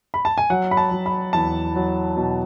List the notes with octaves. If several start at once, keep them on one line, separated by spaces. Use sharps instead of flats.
B5
A5
G#5
F#3 F#5
B5
A5
F#3
B5
E2 A5
F#3
B2